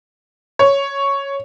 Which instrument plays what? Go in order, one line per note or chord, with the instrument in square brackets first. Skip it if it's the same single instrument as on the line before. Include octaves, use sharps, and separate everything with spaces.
[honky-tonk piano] C#5